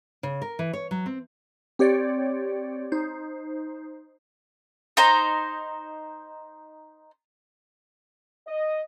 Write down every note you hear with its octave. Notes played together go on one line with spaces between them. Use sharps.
C#3
A#4
E3
C#5
F#3
C4
C4 G4 C#5 D5
D#4 C5
D#4 C5 A#5
D#5